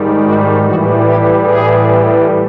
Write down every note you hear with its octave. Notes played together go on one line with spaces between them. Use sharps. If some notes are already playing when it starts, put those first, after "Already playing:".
Already playing: G#2 D#3 G3
F#4
A2 E3 G3 F#4
G4
G#4